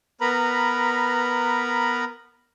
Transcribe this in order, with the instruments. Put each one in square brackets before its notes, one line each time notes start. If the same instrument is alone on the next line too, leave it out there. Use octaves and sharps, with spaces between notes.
[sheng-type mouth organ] B3 A#4 B4 A#5 B5